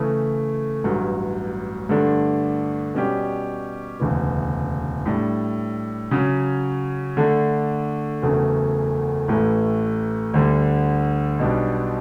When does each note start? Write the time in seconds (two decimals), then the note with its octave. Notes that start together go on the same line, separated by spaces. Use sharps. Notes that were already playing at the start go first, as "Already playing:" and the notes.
Already playing: C#3 E3 A3
0.84 A1 G2 F#3
1.89 G2 D3 A3 D4
2.94 B2 G3 C#4 G4 D5
4.00 E1 D2 C#3 E3
5.06 A2 G3 D4
6.11 C#3 F#3 C#4 F#4
7.17 D3 A3 D4
8.22 F#1 E2 C#3 F#3 A3
9.28 A1 A2 E3 A3
10.34 D2 D3 G3 D4
11.39 B1 B2 G3 D4